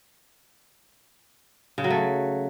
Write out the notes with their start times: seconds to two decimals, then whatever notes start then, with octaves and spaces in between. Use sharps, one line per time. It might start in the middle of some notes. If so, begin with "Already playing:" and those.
1.78 C#3
1.84 F#3
1.90 A3